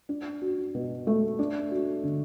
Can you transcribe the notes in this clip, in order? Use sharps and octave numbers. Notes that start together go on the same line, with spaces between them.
D4
F#4
B2
A3
D4
F#4
D3